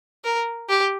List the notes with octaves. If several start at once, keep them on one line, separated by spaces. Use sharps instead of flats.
A#4
G4